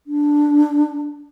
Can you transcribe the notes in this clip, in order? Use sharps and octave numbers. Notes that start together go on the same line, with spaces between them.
D4